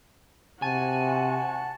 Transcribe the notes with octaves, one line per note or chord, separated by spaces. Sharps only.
C3 F#4 G#5 A5